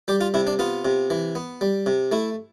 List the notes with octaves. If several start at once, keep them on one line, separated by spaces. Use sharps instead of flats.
G3 G4
F4
C3 E4
D4
B3 F4
C3
E3
B3
G3
C3
A3 E4